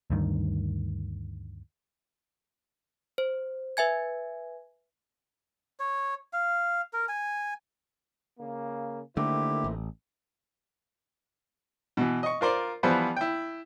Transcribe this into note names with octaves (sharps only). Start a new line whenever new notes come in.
D2 G2 D#3
C5
B4 E5 G#5 G#6
C#5
F5
A#4
G#5
C#3 A#3
D3 D#3 A3 A#3 E4 G4 C5
A1
B2 E3
D#5 C#6
F4 A#4 C5 D5
E3 F3 G3 B3 B4 C5
E4 G5